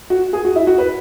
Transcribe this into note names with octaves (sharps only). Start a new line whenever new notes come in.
F#4
G#4
F#4
E4
F#4
B4